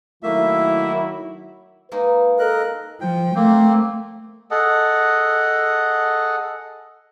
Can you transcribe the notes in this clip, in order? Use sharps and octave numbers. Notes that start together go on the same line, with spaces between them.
D#3 F#3 A3 A#3 E4 E5
G#3 A#3 D#4 B4
A4 A#4 D#5 F#6
F3 G5
A3 A#3 C4
G#4 A4 D#5 F#5